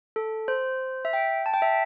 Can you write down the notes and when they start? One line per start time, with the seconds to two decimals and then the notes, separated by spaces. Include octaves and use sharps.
0.16 A4
0.48 C5
1.05 E5
1.13 G5
1.46 A5
1.54 G5
1.62 E5